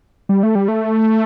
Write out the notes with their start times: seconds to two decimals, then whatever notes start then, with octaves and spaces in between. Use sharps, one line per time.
0.29 G3
0.43 A3
0.55 G3
0.68 A3